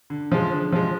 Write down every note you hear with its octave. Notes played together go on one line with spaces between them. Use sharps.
D3
F3 G#3
D3
F3 G#3